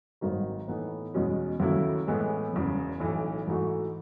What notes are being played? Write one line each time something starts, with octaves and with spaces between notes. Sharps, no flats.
G#1 G#2 D#3 F#3
A2 E3 B3 D#4
E2 B2 G#3 C#4
D#2 C#3 F#3 A3 E4
A2 E3 G#3 B3
E1 E2 C#3
B1 A2 E3
G#2 E3 A3 D#4 F#4